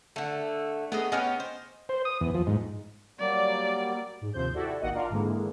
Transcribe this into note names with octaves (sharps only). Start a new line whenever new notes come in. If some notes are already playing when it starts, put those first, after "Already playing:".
D3 A3
A3 B3 G#4 D#5
B3 C#4 G4 D#5 G#5 F6
C5
C5
D#6
E2
F3
G#2
F#3 G3 A#3 D5
G#2
D#2 C3 F3 C5 G6
E4 F#4 G4 A4 D5
A1 D#3 A#3 F#4 D#5 F#5
D4 F4 A#4 D5 F5
G#2 D3 E3 G#3 A#3